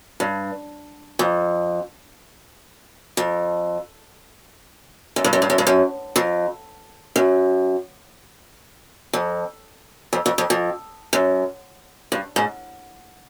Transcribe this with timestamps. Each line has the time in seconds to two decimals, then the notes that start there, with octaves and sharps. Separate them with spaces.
0.20 G2
1.19 F2
3.17 F2
5.16 F#2
5.24 G2
5.33 F#2
5.42 G2
5.50 F#2
5.58 G2
5.67 F#2
6.16 F2
7.16 F#2
9.13 F2
10.13 F2
10.26 F2
10.38 F2
10.50 F2
11.13 F#2
12.12 G2
12.36 G#2